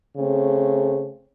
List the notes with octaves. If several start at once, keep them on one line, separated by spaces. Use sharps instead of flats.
C#3 A3 C4